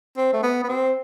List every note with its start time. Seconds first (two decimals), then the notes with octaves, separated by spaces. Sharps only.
0.17 C4
0.33 A3
0.43 B3
0.64 B3
0.69 C4